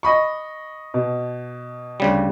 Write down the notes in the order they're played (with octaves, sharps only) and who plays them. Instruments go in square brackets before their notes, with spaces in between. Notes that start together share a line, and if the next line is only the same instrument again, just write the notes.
[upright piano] D#5 B5 C#6
B2
[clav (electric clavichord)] D2 C#3 G3